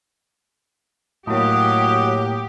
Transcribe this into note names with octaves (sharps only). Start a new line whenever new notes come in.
A2 F#3 A#3 G4 D#5